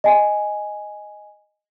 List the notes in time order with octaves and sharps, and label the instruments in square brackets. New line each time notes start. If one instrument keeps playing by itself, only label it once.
[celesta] D#5 G#5